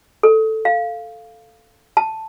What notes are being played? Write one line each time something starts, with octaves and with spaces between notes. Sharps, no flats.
A4
F5
A5